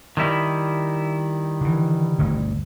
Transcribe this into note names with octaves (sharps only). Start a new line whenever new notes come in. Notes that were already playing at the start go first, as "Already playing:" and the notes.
D#3 G3 E4
D3 E3
G1 D2 G2